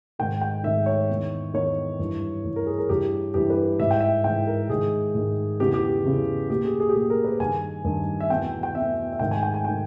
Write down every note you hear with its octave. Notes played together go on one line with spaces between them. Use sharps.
G#2 D#3 G5
G5
G#2 D#3 E5
C#5
E2 D#3
E2 D#3 C#5
G2 E3
G2 E3
A#4
G#4
A#4
G2 E3 G4
G2 E3 G4
B4
G#2 E3 E5
G5
E5
G#2 E3 G5
A#4
G#2 D#3 G#4
G#2 D#3
E2 C#3 E3 G4
G4
E2 C#3 E3
A#2 G4
G#4
G#4
G4
A#2 G#4
A#4
B4
G2 D#3 G#5
G2 D#3
E5
E2 B2 G5
G5
E2 B2 E5
E5
G#2 D#3 G5
G#5
G5
G#5
D#3 G5